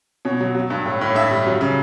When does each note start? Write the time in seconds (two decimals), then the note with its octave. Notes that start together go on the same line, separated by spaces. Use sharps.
0.25 B2 C#5
0.41 F#3
0.55 F#3
0.70 G2
0.86 A2
1.01 A2
1.15 G2 E5
1.31 G3
1.47 F#3
1.61 C#3